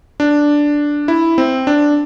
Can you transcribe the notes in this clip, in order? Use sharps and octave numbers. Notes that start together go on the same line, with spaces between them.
D4
E4
C4
D4